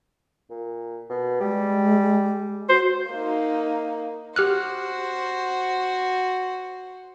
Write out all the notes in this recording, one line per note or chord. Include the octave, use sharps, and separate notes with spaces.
A#2
B2
G3 G#3
F#4 C5
A#3 D#4
F#4 G4 C5 F6 F#6